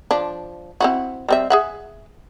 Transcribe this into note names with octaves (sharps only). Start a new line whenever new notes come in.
F3 D4
C4 E4 F#4
G3 C4 E5
G#4 E5 F#5